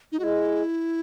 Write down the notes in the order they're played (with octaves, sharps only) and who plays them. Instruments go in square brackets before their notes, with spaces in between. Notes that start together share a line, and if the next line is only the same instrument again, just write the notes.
[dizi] D#4
[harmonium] G#3 [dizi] F#4
[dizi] E4